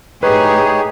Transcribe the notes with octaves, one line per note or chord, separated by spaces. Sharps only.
A2 D#4 G4 G#4 B4 C#5